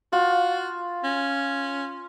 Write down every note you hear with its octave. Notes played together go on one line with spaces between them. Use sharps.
F4 F#4
C#4